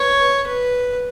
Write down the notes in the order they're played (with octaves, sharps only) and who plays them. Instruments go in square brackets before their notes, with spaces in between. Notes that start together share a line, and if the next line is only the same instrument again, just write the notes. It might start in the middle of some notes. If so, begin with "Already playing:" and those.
Already playing: [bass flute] B4 [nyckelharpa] C#5
[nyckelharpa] B4